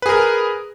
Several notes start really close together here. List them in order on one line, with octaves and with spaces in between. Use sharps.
B4 G#4 A#4